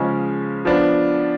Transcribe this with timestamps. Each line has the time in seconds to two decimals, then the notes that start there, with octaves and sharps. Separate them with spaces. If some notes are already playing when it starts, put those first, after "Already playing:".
Already playing: C#3 F3 G#3 C#4
0.65 F3 B3 D4